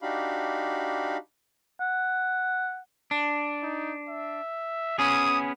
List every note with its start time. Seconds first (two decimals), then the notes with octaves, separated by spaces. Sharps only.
0.02 D4 D#4 F#4 G4 F5 B5
1.80 F#5
3.11 D4
3.62 D#4
4.09 E5
4.99 B3 C#4 G#4 D#6